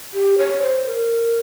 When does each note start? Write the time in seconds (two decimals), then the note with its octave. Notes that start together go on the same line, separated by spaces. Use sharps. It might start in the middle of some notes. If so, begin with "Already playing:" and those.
0.14 G4
0.38 C#5
0.62 C5
0.86 A#4